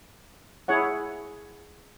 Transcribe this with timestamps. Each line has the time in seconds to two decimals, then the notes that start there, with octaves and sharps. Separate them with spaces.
0.68 E4 G#4 C#5 F#5